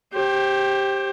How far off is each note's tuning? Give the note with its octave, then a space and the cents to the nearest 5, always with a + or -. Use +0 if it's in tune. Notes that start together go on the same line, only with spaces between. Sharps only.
G4 +0 C5 +30